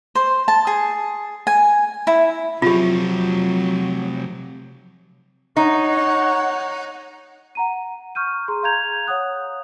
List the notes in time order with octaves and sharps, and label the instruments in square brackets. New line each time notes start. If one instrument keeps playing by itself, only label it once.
[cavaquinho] C5
A5
G#4
G#5
E4
[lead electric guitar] C3 F3 [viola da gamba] F#3 [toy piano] F4 G4
[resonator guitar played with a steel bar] D#4 [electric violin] C#5 F#5 [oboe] C#6
[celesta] F#5 A#5 D#7
C#6 F6 G6 D#7
G#4 A#5 C6
F5 A#5 G6 G#6 F7
C#5 F5 F#5 D#6 F#6